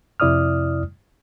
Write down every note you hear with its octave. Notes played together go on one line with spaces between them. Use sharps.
F2 C3 E4 D5 D#6 F6